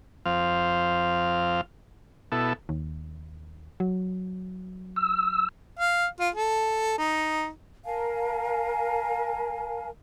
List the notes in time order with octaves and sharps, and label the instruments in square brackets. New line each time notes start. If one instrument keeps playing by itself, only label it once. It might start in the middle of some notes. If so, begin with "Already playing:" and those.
[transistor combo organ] F2 C4 F5
B2 E4 A4
[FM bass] D#2
F#3
[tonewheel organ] E6
[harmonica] F5
F4
A4
D#4
[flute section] A#4 F5 G#5 A5